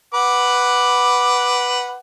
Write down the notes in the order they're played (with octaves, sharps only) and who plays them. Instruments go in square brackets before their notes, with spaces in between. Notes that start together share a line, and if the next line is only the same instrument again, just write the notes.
[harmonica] B4 F#5 D6